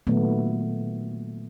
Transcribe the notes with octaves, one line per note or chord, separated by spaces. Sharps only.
A#2 D#3 F#3 A3 B3